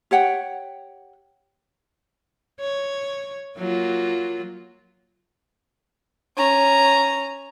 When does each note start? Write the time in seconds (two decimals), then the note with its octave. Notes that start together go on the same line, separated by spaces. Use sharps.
0.11 G4 C#5 F#5 G5
2.60 C#5
3.57 F#3 A#3 F4
6.37 C#4 A#5